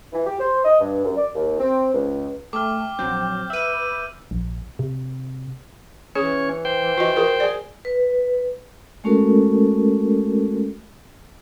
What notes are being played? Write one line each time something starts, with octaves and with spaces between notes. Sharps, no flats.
E3
G4
C5
D#5
G2
F#2
D5
D#2
C4
C#2
A3 G5 D6 F6
A#1 F#3 C4 G6
B4 E5 E6 D#7
A#1
C3
E3 C#4 G#4 C#5
C5 G5
F4 F#4 D#5
F4 G#4 A#4
G#4 D5
B4
G#3 A3 C#4 F#4 A4 A#4